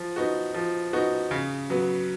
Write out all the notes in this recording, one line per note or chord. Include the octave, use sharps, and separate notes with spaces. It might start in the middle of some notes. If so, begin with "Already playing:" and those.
Already playing: F3
B3 D#4 F#4
F3
B3 D#4 F#4
C#3
F#3 B3